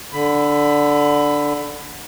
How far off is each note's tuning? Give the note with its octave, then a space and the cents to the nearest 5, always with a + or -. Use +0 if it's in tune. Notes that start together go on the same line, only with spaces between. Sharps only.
D3 +0 B5 +15